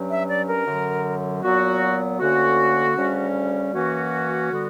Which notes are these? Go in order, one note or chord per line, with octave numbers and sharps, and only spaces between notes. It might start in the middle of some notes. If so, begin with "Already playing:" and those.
Already playing: G2 F#3 C#4
E5
D5
A#4
F#2 D3 F#3
A#2 F#3 B3 F#4
D2 D3 A#3 C#4 F#4
D2 C#3 G3 C#4
F#2 E3 A#3 C#4 F#4
D3 G3 B3